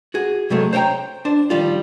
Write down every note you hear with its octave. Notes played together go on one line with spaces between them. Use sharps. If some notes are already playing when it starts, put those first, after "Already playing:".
F#4 G#4
C3 F#3 G#3 A3
C5 C#5 F#5 G5 A#5
D4 C5
D#3 F3 G3 F4